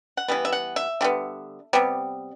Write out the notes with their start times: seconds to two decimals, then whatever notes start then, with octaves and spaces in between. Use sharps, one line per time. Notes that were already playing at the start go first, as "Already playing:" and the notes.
0.17 F#5
0.28 E3 G3 B3
0.45 E5
0.52 F#5
0.76 E5
1.01 D3 G3 B3
1.73 C3 G3 B3